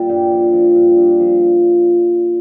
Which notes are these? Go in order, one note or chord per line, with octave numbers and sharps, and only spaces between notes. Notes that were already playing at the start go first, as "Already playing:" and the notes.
Already playing: A#2 G3 D5
G2 G5
F3
F3
G2
G2
F3